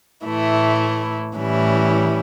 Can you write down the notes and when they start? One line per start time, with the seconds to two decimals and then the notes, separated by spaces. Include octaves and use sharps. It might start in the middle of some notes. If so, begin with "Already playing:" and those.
0.25 A2 E3 A3 E4
1.37 A2 E3 G3 C#4 E4